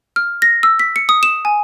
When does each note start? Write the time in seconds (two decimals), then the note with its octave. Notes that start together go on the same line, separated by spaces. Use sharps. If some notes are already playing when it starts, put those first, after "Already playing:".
0.16 F6
0.42 A#6
0.63 E6
0.79 B6
0.96 C#7
1.09 D#6
1.23 E7
1.45 G#5